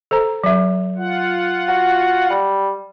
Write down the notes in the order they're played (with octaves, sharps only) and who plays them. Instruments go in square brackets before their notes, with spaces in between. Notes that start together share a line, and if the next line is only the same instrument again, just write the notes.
[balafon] A4 C5 A#5
F#3 E5
[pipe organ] F4 F#5
[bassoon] F#4
G3